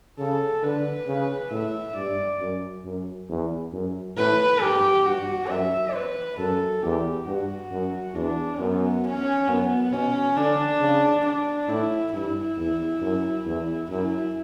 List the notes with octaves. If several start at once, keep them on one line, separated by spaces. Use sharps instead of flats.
C#3 A4
D3 B4
C#3
A2 E5
G2 D5
F#2
F#2
E2
F#2
A2 B4
G2 G4
G2 F#4
F#2 E5
B4
F#2 A4
E2 G4
G2 F#4
F#2
E2 D4
F#2 B3
C#4
F#2 B3
B2 C#4
D3 D4
C#3
D4
A2 E4
G2 E4
E2
F#2
E2
F#2 E4